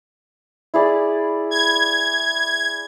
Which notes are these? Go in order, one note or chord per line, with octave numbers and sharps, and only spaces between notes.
E4 G#4 D5
G#6